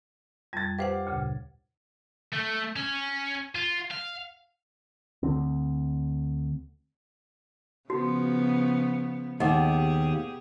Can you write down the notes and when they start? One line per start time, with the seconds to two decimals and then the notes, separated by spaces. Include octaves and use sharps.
0.53 F2 G3 G#6 A6
0.79 G4 B4 C5 F5 F#5
1.07 D2 A#2 C#3
2.33 A3
2.76 C#4
3.55 F4
3.91 F5
5.23 D2 D3 C4
7.90 C#3 F3 B3 F#4
9.40 D#2 B2 G4 G#4 D#5 F#5 D6